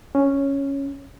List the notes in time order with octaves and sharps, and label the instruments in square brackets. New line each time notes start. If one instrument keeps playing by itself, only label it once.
[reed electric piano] C#4